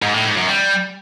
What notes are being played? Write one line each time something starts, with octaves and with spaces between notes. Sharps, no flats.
G#2
A2
G#2
F#2
G3